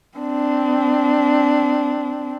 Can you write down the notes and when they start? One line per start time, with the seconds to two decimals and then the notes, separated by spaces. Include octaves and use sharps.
0.18 C4 D4